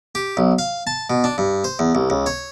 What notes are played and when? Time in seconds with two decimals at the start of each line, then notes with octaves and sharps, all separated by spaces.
0.15 G4
0.37 B1
0.59 F5
0.87 A5
1.10 B2
1.24 D4
1.38 G2
1.64 C5
1.79 E2
1.95 C2
2.10 C#2
2.26 C#5